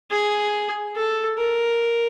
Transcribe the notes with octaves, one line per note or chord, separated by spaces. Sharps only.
G#4
A4
A#4